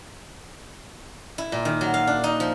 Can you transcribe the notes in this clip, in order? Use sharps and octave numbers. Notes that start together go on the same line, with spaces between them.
E4
A#2
D#3
F#3
F5
D4
D#4
F3